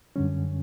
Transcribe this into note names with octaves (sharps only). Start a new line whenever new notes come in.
F#2 D3 G3 C#4